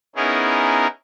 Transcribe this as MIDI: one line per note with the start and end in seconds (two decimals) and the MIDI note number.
0.16 0.87 59
0.16 0.87 61
0.16 0.87 63
0.16 0.87 64
0.16 0.87 68
0.16 0.87 70